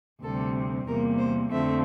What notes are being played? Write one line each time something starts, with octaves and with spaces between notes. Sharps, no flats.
D2 C3 G3 C4 A4
E2 C3 G3 A#3 A#4
C5
F2 D3 F3 A3 C4 E5